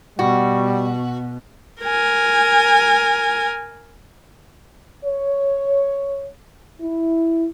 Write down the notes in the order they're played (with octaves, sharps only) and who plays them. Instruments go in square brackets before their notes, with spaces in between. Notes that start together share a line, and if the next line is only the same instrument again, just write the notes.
[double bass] B2 [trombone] G3 [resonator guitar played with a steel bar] F#4
[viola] A#4 G#5
[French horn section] C#5
E4